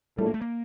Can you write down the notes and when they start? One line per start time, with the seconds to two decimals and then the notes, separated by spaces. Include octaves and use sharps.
0.17 A#1 A2 G3 A3
0.26 A#3
0.34 A3
0.41 A#3